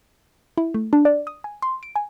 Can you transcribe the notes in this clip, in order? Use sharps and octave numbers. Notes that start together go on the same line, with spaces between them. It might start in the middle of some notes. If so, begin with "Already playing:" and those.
E4
A3
D4
D5
D#6
G#5
C6
D7
G#5